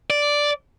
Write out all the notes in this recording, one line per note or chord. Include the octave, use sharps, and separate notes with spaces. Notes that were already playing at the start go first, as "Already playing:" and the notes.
D5